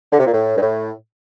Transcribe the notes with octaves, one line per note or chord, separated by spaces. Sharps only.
D3
C3
A#2
A2
G2
A2